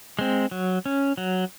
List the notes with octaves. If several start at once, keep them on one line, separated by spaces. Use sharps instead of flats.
G#3 C4
F#3
C#4
F#3